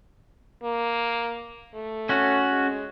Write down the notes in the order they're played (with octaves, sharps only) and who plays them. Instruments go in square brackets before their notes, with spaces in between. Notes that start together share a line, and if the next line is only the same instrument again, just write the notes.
[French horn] A#3
A3
[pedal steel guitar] C#4 F#4
[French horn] G#3